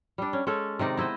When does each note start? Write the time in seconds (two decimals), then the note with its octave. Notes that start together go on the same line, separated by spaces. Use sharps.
0.18 G3 D4
0.33 C#4
0.47 G#3 C#4 A4
0.79 C3 D#3 D#4 D5
0.97 B3 E4 C5 D#5